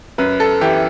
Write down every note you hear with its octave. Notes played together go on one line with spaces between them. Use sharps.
F#2 B4
A4
E3 G4